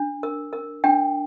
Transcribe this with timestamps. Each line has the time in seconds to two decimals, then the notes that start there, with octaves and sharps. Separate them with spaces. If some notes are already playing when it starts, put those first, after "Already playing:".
Already playing: D4
0.23 A#4
0.53 A#4
0.84 D4 G5